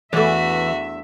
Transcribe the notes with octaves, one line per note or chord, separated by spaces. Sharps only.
E2 E3 A3 D4 F#4 E5